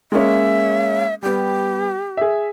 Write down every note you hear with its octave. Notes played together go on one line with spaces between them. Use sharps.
G#3 A#3 C#4 E5
G3 B3 G4
G#4 E5